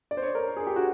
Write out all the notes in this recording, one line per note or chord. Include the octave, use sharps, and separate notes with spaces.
D5
C5
C#5
A#4
G#4
G4
F#4